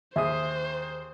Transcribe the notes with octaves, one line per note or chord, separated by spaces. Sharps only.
D#2 G#4 C5 E5 D#6